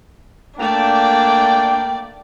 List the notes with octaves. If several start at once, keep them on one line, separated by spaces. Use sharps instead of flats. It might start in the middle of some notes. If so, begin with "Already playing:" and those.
A3 A#3 D4 D5 G5